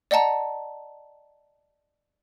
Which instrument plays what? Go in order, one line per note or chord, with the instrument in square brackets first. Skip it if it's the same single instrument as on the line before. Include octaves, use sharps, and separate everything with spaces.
[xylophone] D5 D#5 F#5 A5 A#5